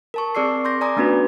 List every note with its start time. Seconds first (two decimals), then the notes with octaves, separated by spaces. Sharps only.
0.14 A#4 A5 C#6
0.35 C4 G#4 D5 D6 E6 C7
0.65 C6 D6 G6 A#6
0.81 D5 G#5 A#5 D6 D#6
0.96 A3 B3 C#4 D4 F#4 B4